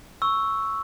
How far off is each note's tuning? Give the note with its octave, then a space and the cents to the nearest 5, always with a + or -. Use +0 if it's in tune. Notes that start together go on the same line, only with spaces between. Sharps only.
C#6 +0 E6 +0